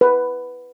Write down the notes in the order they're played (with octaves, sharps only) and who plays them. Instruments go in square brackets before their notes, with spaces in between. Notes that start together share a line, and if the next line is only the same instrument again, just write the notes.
[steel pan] B4